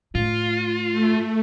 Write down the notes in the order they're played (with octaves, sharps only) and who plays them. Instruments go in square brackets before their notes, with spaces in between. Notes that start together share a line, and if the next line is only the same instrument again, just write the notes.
[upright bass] A2 [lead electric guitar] F4
[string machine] A3